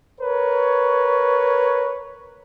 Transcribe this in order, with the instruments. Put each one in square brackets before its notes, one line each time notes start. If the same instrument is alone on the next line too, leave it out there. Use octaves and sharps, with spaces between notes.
[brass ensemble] A#4 B4 C#5